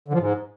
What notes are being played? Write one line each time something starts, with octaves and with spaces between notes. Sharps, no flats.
D3
F3
G#2